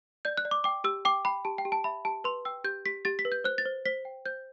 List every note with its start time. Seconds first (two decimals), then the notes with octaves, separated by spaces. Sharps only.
0.25 D5 G6
0.37 F#6
0.45 D5
0.51 D6
0.64 G5 D6
0.84 G4 E6
1.05 G5 D6
1.25 G5 B5
1.45 G4 A5
1.58 G5
1.65 G4
1.72 A5
1.84 E5 B5
2.05 G4 A5
2.24 B4 C6
2.45 G5 E6
2.64 G4 G6
2.85 G4 B6
3.05 G4 A6
3.19 B6
3.25 B4
3.32 G6
3.44 C5 F#6
3.58 A6
3.65 C5
3.85 C5 B6
4.05 G5
4.25 C5 G6